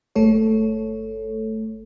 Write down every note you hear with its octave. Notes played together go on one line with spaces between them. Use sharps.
G1 A3 A4 C#5